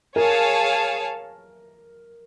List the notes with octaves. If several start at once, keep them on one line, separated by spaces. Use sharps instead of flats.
G#4 A#4 C#5 F5 A5